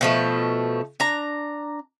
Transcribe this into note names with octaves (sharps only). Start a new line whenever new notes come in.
B2 F3 A3
D4 A#5